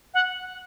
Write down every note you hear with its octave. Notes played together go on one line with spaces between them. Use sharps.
F#5